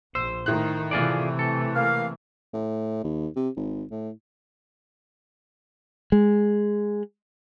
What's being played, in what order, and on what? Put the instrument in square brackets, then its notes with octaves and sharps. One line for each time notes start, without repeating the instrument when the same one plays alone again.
[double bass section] A#1 [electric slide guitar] C5 [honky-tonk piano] E6
[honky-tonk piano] A2 F#6 [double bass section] D#3
[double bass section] C3 E3 A3 [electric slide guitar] F4 G#4 D5
[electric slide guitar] A4
[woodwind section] A#3 F5
[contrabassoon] A2
D#2
C3
G#1
A2
[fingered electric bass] G#3